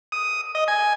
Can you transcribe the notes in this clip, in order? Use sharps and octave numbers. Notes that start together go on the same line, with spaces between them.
D#6
D#5
G#5